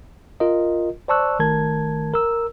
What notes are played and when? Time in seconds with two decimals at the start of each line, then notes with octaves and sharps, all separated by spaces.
0.40 F4 A#4 D#5
1.08 C5 D5 A5 C#6 E6 F#6
1.39 G#1 D#3 A3 A#4 A5 G#6
2.14 A#4 E6